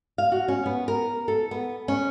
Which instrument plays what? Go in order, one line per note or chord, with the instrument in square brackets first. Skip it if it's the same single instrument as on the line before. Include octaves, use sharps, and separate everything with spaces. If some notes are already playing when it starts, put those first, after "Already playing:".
[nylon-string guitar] F5
F#4
C#4
B3
A#4
A4
B3
C#4